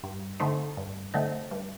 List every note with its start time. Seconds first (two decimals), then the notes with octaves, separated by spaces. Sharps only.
0.03 G2
0.40 D3 A3 C4 D#4
0.77 G2
1.14 D3 A3 C4 D#4
1.51 G2